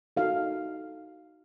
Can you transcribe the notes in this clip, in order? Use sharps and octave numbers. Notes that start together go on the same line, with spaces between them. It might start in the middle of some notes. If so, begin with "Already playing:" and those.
D#4 F#4 A4 F5